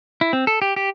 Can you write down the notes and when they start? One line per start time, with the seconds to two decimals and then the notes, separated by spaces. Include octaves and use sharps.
0.21 E4
0.33 C4
0.47 A4
0.62 G4
0.76 G4